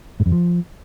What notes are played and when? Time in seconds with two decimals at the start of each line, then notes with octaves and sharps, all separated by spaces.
0.20 G#2
0.26 F2
0.32 F3